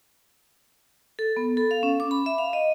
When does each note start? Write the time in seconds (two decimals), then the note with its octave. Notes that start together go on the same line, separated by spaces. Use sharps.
1.19 A4
1.37 B3
1.57 A4
1.71 F5
1.83 C#4
2.00 D6
2.11 B5
2.26 E5
2.38 F5
2.53 D#5